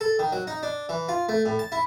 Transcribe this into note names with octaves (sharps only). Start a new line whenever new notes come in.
A4
D#3
F#3
D#4
D4
E3
F4
A3
A2
A5
E4